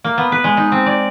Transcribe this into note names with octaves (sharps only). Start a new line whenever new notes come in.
A#3
B3
B4
G#3
D#4
C4
D5